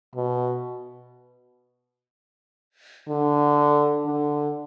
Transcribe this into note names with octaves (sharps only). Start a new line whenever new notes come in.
B2
D3
D3